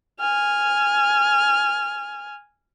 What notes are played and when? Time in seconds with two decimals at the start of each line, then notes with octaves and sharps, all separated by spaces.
0.20 G#5 F6